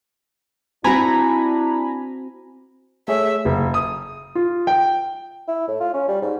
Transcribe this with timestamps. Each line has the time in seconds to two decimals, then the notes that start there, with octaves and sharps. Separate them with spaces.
0.84 C4 D4 E4 F#4 G#5 A#5 B5
3.08 A3 G#4 C#5 E5
3.45 F#1
3.74 D#6
4.35 F4
4.67 G5
5.48 E4
5.68 A2
5.80 F4
5.94 C#4
6.08 G3
6.22 G#2